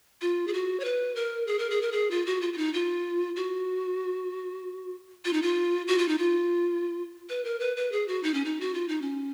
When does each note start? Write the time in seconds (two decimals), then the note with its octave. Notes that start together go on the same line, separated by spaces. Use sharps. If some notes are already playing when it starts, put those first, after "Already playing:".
0.22 F4
0.47 G#4
0.54 F#4
0.80 C#5
0.85 B4
1.16 A#4
1.47 G#4
1.59 A#4
1.70 G#4
1.82 A#4
1.92 G#4
2.11 F4
2.26 F#4
2.41 F4
2.53 F4
2.58 D#4
2.74 F4
3.36 F#4
5.25 F4
5.33 D#4
5.42 F4
5.88 F#4
5.98 F4
6.08 D#4
6.18 F4
7.29 B4
7.45 A#4
7.60 B4
7.77 B4
7.92 G#4
8.08 F#4
8.23 D#4
8.34 C#4
8.45 D#4
8.61 F#4
8.74 F4
8.88 D#4
9.02 C#4